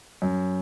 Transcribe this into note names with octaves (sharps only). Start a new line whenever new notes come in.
F#2